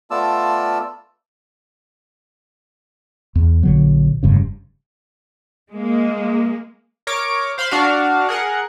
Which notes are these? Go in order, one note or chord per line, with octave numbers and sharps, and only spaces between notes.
A3 B3 F4 D5 A5 E6
E2
A#1 D3 F#3
F1 G2 C#3
G#3 A#3
A#4 C#5 D6 D7
C5 F5 B5 C6
D4 F#4 F5
G#4 A#4 F#5